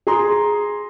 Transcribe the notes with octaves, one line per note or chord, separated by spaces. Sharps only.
G#4 A#5 C6